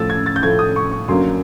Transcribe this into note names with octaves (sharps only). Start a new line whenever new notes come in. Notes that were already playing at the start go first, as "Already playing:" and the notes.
Already playing: A2 F3 A3 E6 A6
G#6
A6
G6
A2 F3 A3 G#6
D#6
C#6
C#6
F#2 D3 F#3 A#3 C6